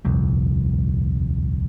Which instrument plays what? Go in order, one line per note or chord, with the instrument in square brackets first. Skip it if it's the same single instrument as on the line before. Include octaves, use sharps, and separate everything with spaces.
[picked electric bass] D#1 C2 F2